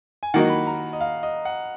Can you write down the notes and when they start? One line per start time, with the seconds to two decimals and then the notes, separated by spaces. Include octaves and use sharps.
0.23 G#5
0.34 D#3 F#3 A#3 D#4 F#5
0.50 B5
0.67 A#5
0.93 D#5
1.01 F5
1.23 D#5
1.45 F#5